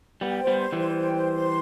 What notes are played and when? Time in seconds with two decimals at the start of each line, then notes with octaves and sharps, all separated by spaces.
0.21 G3 B3 G5
0.40 C5
0.47 G3 B3
0.60 C6
0.72 E3 G3
0.79 C5
0.98 G5
1.16 C5
1.35 C6